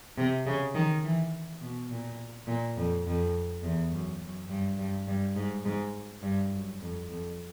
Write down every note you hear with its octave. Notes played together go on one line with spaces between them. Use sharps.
C3
C#3
D#3
E3
B2
A#2
A#2
F2
F2
E2
F#2
F#2
G2
G2
G2
G#2
G#2
G2
F#2
F2
F2